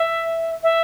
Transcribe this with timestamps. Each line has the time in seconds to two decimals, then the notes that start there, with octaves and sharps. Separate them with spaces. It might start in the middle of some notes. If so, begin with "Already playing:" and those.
Already playing: E5
0.63 E5